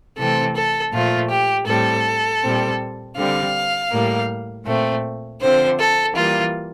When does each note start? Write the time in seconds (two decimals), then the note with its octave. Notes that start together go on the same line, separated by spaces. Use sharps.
0.18 C3 E3 A3 C4 A4
0.55 A4
0.92 A#2 F3 A3 F4
1.30 G4
1.67 A2 G3 C4 A4
2.42 A#2 G3 C4
3.16 D3 G3 C4 F5
3.91 A2 G3 A#3
4.66 A#2 A3 C4
5.40 D3 F3 C4 C5
5.78 A4
6.15 E3 G3 A#3 F4